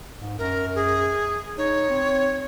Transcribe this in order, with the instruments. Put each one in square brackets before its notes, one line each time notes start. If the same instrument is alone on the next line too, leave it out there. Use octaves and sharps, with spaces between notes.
[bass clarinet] G#2
[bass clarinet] F#2 [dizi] A#4
[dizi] G#4
[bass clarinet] D#4 [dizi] C#5
[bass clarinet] C4